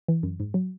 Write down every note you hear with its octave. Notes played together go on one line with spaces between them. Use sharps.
E3
F#2
G#2
F#3